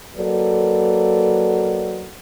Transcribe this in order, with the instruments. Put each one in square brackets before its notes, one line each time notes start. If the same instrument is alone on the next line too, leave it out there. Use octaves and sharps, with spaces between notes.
[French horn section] F#3 A#3 A4 B4 D5